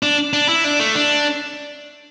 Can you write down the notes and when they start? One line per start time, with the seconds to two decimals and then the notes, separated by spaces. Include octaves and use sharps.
0.03 D4
0.33 D4
0.48 E4
0.64 D4
0.80 A3
0.95 D4